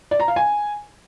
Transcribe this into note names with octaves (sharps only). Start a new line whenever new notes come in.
D5
A#5
F5
G#5